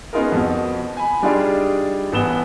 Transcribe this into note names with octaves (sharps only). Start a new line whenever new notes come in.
B3 C#4 D#4 F4 G#4 A#4
F2 B2
G#5 B5
G3 D4 D#4 F4 G#4 D5
A1 B3 E7 G7